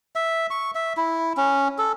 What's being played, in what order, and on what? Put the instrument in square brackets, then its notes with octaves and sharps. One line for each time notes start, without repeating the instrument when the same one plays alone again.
[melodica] E5
C#6
E5
E4
C#4
A4